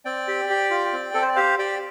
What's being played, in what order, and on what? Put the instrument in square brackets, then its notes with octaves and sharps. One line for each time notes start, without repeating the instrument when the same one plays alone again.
[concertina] C4 D5 G5
G4
G4
F4
C4
C4 A4
C5
D5
G4 C5 F5
G4 D5 G5